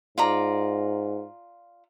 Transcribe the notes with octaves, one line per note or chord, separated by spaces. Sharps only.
G#2 F4 D5 A#5